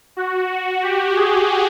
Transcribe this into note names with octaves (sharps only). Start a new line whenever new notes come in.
F#4
G4
G#4